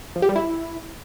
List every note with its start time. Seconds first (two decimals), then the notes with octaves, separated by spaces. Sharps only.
0.16 F3
0.22 G4
0.29 G3
0.36 E4